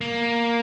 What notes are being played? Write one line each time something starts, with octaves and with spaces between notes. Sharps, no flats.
A#3